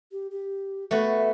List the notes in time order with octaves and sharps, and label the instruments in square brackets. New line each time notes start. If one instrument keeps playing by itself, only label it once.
[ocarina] G4
G4
[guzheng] A3 B3 F#4 [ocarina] F#5
[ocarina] E5